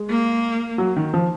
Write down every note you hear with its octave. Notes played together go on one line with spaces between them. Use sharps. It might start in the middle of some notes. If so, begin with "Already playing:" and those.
Already playing: G#3
A#3
F#3
D#3
F3